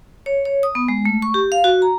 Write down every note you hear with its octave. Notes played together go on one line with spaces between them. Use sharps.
C#5
C#5
D#6
B3
G#3
A3
C#6
G4
F5
F#4
A#5